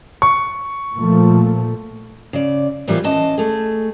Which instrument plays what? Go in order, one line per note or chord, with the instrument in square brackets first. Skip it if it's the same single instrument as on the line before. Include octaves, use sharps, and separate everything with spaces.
[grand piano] C#6
[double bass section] A#2 F3 A3
[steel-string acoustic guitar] C#3 D5
A2 E3 G3 A#3 C4 F4
E3 C#4 D#5 A5
A3 G#4